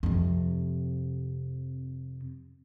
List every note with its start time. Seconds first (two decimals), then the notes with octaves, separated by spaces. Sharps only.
0.03 F2 C3